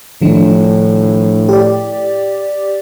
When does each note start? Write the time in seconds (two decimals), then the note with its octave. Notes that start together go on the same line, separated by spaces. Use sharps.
0.22 A2 D#3 F3 D4
1.49 G4 D5